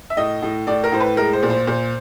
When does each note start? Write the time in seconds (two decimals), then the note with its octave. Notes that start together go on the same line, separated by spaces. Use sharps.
0.10 E5
0.17 A2 D#5
0.42 A2
0.67 A2 D5
0.84 A#4
0.92 A2 C5
1.00 B4
1.16 G#3 A#4
1.33 C5
1.42 A#2
1.50 C5
1.67 A#2 C5